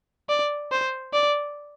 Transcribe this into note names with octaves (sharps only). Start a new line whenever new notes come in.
D5
C5
D5